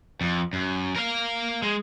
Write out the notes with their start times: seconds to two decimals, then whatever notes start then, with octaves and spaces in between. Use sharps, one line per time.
0.21 F2
0.53 F#2
0.96 A#4 F5
1.62 G#3